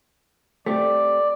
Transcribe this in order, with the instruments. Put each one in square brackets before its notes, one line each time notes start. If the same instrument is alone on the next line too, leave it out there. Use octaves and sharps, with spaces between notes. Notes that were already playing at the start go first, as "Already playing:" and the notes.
[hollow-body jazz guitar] A3 C4 G4 [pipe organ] D5